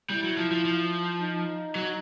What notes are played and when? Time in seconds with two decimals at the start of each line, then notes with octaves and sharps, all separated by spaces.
0.10 G3 E4
0.24 F#3
0.37 F3
0.51 F3
0.65 F3
1.21 D#4
1.75 F#3